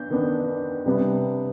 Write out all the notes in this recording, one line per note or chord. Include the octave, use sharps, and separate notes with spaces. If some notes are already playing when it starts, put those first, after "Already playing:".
Already playing: B3 D4 G6
D#3 B3 D4
C3 G3 B3 D4